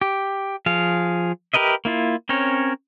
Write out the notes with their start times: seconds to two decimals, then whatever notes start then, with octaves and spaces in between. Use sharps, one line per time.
0.01 G4
0.66 F3 G#4 F5
1.54 G4 A#4 B4 D#5 E5
1.85 A#3 E4 F4
2.29 C4 C#4 A#4 C#5